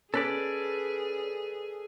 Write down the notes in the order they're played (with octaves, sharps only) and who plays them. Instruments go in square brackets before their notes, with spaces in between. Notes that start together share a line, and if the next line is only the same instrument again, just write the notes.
[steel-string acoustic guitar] C#4 [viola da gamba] G#4 [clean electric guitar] A4 B4 D5